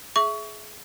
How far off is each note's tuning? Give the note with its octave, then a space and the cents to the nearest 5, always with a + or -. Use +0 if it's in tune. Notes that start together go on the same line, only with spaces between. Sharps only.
G#4 +25 E5 +0 C#6 +25